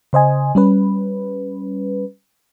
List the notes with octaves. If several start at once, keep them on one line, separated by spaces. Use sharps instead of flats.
C#3 C5 D#5 G#5
G3 C#4 B4